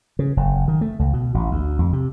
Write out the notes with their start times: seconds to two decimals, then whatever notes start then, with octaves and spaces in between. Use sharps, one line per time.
0.19 C#3
0.37 F#1
0.68 D#3
0.81 A3
0.99 C#2
1.13 B2
1.34 A1
1.51 D2
1.79 F2
1.93 C3